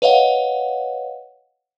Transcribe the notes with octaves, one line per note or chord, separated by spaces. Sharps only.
B4 C#5 D#5 F5 F#5